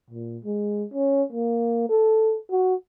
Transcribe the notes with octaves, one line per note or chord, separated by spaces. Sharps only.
A#2
G#3
C#4
A#3
A4
F#4